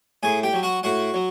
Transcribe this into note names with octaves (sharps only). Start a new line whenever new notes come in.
A2 G#4 G#5
G4 G5
F#3
F#4 F#5
A2 F#4 F#5
F#3